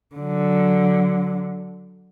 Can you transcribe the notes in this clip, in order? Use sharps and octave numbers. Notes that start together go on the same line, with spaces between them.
D3 F#3